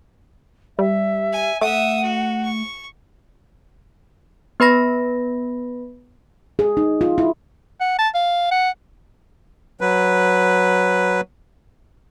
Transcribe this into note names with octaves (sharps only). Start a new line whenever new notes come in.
G3 E5
G#5
A3 E5 F#5 D#6
F#4
C#6
B3 B4 B5 A#6
G#4
D#4
F4
E4
F#5
A5
F5
F#5
F#3 B4